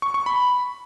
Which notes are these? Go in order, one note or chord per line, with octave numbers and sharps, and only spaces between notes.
C#6
C#6
B5